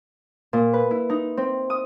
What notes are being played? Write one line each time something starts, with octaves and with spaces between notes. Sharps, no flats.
A#2
B4
E4
D#4
C4
D#6